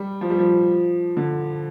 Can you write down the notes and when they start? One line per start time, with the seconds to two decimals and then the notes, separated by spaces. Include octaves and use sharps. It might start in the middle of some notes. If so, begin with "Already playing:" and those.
Already playing: G3
0.21 F3
0.30 G3
0.39 F3
1.17 D3